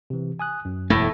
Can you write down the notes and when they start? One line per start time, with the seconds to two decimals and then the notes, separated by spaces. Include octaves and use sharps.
0.10 C3 E3
0.39 G#5 D#6 F#6
0.65 F#2
0.90 E1 A2 A3